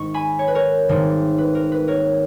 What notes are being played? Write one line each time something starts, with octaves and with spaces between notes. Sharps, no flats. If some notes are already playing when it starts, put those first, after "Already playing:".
Already playing: G#1 G#2 D#5 C#6
G#5 B5
C#5
B4
A#4 C#5
G#1 G#2 D#3 G3 A#3
B4
A#4
B4
A#4 C#5